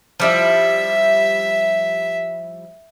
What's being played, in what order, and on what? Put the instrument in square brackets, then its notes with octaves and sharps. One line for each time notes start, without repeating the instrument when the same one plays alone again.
[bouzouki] F3 G3 E4 [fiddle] E5